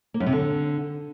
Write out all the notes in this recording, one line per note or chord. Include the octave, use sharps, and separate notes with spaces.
A#3
F#2
C3
D3